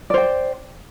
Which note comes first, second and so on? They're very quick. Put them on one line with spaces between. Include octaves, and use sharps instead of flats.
D5 C5 G5